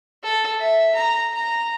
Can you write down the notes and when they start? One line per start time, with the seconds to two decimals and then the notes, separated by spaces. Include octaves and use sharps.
0.24 A4
0.60 E5
0.95 A#5
1.33 A#5